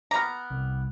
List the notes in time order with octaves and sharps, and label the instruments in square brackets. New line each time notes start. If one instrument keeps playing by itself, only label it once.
[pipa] B3 A#5 [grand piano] D6 F6
[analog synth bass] C2